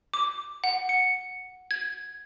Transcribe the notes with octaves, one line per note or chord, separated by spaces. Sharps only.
D6
F#5
C#7
G#6